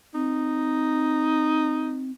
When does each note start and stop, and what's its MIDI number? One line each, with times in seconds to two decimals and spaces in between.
0.14 2.11 60
0.14 2.11 63